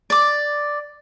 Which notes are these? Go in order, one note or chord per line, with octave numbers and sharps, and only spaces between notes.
D5 D6